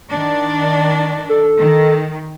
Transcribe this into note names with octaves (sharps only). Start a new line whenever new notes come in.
D#3 D4
A4
D#3